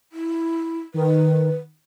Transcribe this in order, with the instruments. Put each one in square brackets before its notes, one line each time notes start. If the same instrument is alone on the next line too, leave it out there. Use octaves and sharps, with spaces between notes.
[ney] E4
[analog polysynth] D#3 [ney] B4